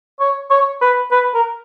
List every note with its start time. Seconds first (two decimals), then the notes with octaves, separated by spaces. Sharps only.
0.20 C#5
0.50 C#5
0.81 B4
1.11 B4
1.34 A#4